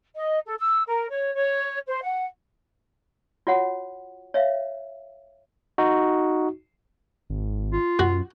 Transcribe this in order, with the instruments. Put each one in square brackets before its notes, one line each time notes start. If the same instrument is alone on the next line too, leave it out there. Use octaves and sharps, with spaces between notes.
[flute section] D#5
A4
E6
A#4
C#5
C#5
C5
F#5
[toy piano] F4 F#4 C#5 F#5
C#5 E5 F5
[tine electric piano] D#4 F#4
[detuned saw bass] G#1
[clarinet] F4
[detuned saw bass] F#2 [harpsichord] F#4